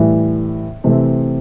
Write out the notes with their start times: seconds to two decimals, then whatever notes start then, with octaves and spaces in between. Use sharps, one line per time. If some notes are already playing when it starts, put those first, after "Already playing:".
Already playing: A2 E3 G3
0.84 C3 E3 A3 C4